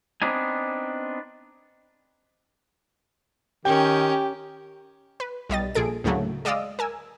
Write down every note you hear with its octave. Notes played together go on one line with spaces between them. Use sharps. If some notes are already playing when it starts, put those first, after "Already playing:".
B3 C4 D4 D#4 G#5
D#3 C#4 G4 A#4 G5
B4
B1 G3 D#5 A6
A#1 A#2 G#4 A4 D7
D2 A2 C#3 F#3 A3 A#3
G#3 D5 D#5 F5 D#6 E6
A#4 G#5 E6